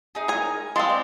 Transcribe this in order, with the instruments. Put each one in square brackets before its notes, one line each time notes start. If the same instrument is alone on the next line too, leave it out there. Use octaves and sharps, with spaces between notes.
[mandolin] D#4 G#4
[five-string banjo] A#4 G#5
[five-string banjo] G#3 C4 [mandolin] F5 A5 C6
[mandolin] D5